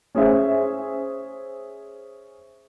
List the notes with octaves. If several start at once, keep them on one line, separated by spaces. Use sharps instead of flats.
C#4 G#4 C5 E5